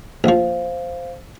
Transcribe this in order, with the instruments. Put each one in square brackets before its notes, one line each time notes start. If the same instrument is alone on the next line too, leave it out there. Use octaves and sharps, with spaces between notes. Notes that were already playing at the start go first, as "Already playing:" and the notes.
[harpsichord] A#1 F3 [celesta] C5 F5